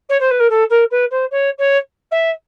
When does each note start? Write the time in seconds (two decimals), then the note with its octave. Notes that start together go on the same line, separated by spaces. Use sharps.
0.09 C#5
0.20 C5
0.30 B4
0.39 A#4
0.49 A4
0.70 A#4
0.90 B4
1.11 C5
1.31 C#5
1.58 C#5
2.11 E5